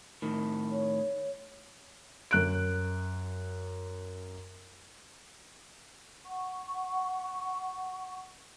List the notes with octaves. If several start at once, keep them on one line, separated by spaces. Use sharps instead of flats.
A2 D#3
C#5
F#2 F#6 D7
F#5 C#6